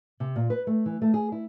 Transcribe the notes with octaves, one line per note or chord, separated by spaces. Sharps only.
C3
A#2
B4
A3
E3
A3
G#4
E4